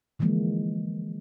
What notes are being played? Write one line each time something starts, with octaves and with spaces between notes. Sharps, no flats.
D3 E3 F3 G#3 A#3